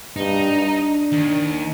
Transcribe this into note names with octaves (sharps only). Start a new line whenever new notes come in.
G2 D#4
D4
D#2